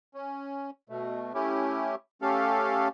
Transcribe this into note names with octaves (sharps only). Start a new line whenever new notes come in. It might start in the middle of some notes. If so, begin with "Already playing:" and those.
C#4
B2 A3
A3 C#4 E4 G4
A3 C#4 G4 A4 F5